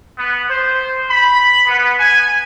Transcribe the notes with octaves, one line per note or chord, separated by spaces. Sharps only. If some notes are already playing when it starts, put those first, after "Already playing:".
B3
C5
B5
B3
G#5